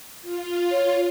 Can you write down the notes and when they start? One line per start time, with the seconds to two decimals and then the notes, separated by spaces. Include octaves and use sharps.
0.22 F4
0.71 C#5